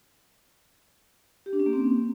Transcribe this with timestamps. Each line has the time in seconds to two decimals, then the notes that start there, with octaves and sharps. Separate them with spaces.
1.46 G4
1.53 D4
1.60 C#4
1.66 A#3
1.73 C4